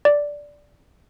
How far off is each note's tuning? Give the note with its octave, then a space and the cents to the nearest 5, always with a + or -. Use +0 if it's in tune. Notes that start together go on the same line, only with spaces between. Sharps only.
D5 -5